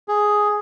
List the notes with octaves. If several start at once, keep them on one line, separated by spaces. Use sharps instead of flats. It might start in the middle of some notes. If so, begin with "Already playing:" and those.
G#4